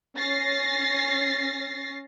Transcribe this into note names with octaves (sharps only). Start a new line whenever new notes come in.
C#4 A6 A#6 C7